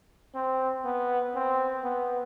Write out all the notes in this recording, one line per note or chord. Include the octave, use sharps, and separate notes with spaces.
C4
B3
C4
B3